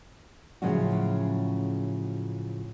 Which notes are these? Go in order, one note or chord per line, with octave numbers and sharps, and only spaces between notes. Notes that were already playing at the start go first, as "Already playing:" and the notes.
A2 C#3 F3 F#3 C#4 F#4